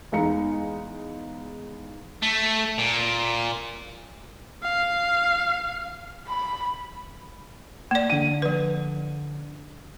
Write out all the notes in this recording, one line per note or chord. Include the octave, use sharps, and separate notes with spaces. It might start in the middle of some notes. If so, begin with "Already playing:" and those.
E2 G#3 D#4 F5 A#5 C#7
A3
A#2
F5
B5
A#3 D5
D3 D#7
F3 B4